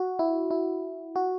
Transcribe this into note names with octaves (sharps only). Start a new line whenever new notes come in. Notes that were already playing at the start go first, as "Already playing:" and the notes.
Already playing: F#4
E4
E4
F#4